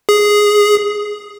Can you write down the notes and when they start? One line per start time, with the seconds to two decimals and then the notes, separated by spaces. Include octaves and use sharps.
0.09 G#4